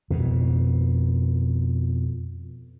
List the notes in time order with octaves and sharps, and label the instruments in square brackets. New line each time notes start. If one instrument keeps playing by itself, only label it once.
[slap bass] F2 B2